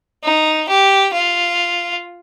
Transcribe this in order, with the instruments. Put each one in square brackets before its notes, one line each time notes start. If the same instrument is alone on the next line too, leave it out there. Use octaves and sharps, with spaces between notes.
[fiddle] D#4
G4
F4